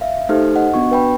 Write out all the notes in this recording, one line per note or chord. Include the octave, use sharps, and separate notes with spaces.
E5 F5
A3 D#4 G4 A4 C5 F6
D#5 F#5
B3 D4 F#4 C#6
B4 G5 B5